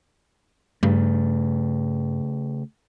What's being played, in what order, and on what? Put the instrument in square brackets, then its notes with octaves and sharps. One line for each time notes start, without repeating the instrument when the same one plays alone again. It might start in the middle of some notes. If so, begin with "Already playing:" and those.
[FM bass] G2 [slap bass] C#3 A3